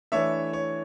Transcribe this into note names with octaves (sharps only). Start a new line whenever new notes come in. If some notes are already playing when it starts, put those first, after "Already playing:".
E3 A3 D4 C#5 E5
C#5